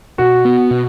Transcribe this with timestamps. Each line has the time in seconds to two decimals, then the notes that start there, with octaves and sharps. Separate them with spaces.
0.18 B2 F#4
0.45 B3
0.71 B2